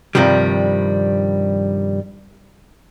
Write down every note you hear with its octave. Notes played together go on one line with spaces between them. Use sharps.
G2 C3 D#3 F3 G3